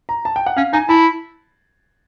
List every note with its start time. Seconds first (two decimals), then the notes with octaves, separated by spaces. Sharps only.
0.09 A#5
0.25 A5
0.36 G5
0.46 F#5
0.57 C#4 F5
0.73 D#4 G#5
0.89 E4 A5